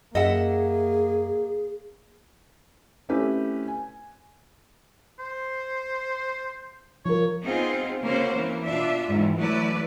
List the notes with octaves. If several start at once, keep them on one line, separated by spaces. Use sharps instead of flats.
F#2 A#3 G#4 D#5 E5 F#5
A3 C4 C#4 E4 G4 B4
G#5
C5
F3 A#4 C#5
B3 C4 D#4 F4 G#4
C#3 A#3 C4 C#4 F#4 C5
E3 A#3
B2 D4 F4 E5
E2 G#2 D#3
E3 F#3 A3 E4 B4 D5